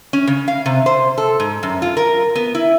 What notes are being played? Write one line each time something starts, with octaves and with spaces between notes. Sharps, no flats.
C#4
C#3
F5
C3
C5
A4
G#2
F#2
F4
A#4
B3
E4